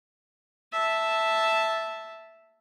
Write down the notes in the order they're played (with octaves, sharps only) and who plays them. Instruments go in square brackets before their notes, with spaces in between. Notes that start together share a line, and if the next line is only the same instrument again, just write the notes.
[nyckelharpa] E5 A5